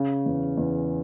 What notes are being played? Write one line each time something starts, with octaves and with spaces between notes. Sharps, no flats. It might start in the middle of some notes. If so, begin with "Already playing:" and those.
Already playing: C#3
E2
E2